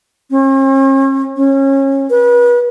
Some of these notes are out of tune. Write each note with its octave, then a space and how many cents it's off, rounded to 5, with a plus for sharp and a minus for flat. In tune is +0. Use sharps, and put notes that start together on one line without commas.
C#4 -45
C#4 -25
B4 -35